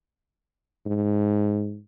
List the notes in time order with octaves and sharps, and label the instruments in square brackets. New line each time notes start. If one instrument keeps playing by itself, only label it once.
[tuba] G#2